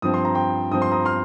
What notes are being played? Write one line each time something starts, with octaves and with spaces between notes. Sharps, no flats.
G2 F3 C4 D#6
C6
A#5
G5 C6
G2 F3 C4 D#6
C6
A#5 D#6
C6 F6